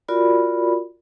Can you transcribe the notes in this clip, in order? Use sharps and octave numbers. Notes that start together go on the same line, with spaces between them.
F4 F#4 A#4 D5 B5